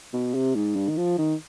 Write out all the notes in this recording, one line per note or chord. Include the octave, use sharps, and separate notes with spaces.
B2
C3
G#2
G2
D#3
F3
D#3